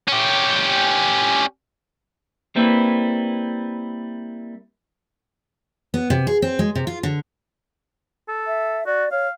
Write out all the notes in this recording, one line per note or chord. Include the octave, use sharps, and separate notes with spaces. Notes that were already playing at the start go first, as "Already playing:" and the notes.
C#4 G4
G3 A#3 C4 E4 B4
B3
C3
G#4
C4
G#3
C3
F4
D3
A4
E5
F#4 D5
C#5 F5